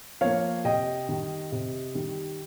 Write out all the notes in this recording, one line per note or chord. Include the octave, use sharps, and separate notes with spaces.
F3 A#3 C#5 F5
C3 D#5 G5
D#3 G3
C3
D#3 G3